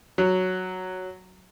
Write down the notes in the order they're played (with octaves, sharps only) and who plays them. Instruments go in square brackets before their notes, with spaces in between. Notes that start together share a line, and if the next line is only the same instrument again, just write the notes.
[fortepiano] F#3